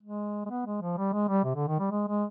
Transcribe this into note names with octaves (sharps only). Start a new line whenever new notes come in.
G#3
G#3
B3
G#3
F3
G3
G#3
G3
C3
D3
D#3
G3
G#3
G#3